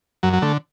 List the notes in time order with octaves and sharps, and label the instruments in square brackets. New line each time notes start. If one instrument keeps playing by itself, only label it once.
[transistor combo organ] F#2 F#3
F#3
D3 A3